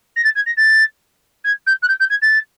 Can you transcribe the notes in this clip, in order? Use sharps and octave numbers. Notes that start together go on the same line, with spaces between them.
A#6
A6
G#6
A#6
A6
G#6
G6
F#6
G6
G6
G#6
A6